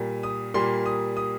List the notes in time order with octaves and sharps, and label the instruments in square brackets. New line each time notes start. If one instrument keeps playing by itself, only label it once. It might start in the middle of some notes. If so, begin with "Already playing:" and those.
Already playing: [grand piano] A#2 G3 A#3
D#6
A#2 G3 A#3 C6
D#6
D#6